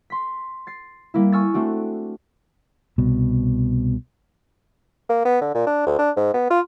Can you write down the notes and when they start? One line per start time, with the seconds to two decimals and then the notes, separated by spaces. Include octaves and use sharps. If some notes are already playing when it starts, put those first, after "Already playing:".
0.10 C6 B6
0.67 A6 C7
1.14 G3 A#3 E4
1.32 G#5 C#6 E6 F6 A6
1.54 A3 C4 D4 F#4
2.98 C2 B2
5.10 A#3
5.25 B3
5.41 D3
5.54 A#2
5.67 D4
5.87 D2
5.99 D4
6.17 G#2
6.34 B3
6.50 F4